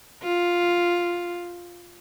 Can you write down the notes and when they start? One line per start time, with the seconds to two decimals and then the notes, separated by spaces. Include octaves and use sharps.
0.23 F4